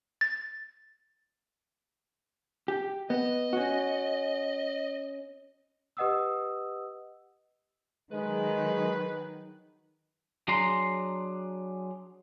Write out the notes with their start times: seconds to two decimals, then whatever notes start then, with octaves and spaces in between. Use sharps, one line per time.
0.21 A6
2.68 G4
3.10 B3 D#5
3.53 C#4 F#4
5.97 G4 B4 D#5 F#5 D#6 E6
8.12 D#3 F#3 G#3 G#4 B4
10.48 F#3 D4 G#4 A#5 C6